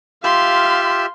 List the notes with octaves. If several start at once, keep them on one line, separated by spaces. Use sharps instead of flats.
F4 G4 E5 F5 C6